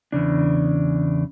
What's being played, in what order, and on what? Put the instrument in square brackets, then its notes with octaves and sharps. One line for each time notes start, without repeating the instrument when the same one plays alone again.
[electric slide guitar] E2 G2 C#3 D4